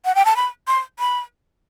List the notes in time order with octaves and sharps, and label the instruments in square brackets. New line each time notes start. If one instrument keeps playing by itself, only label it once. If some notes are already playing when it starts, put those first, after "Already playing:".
[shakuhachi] F#5
G5
A5
B5
C6
B5